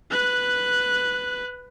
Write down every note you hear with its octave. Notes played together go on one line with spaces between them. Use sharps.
B4 F#6